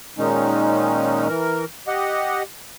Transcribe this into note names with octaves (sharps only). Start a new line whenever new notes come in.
A#2 D#3 G#3 C#4 D#4
E3 A#4
G4 D#5 F#5